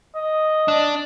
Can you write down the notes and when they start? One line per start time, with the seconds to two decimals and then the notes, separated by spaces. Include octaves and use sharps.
0.16 D#5
0.68 D4